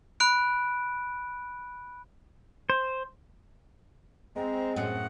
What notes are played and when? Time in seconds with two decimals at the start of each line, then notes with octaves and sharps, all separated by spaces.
0.20 B5 F#6 D7
2.70 C5
4.36 G#3 C4 A#5
4.76 F#2 A2 G#4 F#5